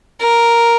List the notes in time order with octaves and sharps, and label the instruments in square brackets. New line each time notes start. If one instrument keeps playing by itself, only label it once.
[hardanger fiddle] A#4